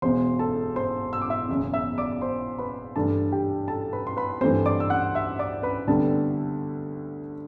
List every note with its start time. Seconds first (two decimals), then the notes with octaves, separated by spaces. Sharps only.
0.02 E1 E2 B2 C5 C6
0.39 A4 A5
0.76 C5 C6
1.13 E6
1.22 D6
1.30 E5 E6
1.48 F#1 E2 B2
1.73 E5 E6
1.98 D5 D6
2.22 C5 C6
2.59 B4 B5
2.96 G2 E3 A3 D4 A4 A5
3.32 G4 G5
3.68 A4 A5
3.93 B4 B5
4.07 C6
4.17 B4 B5
4.41 G2 E3 A3 C4 C5 C6
4.66 D5 D6
4.80 E6
4.90 F#5 F#6
5.15 E5 E6
5.39 D5 D6
5.63 B4 B5
5.88 D2 C3 G3 B3 D4 A4 A5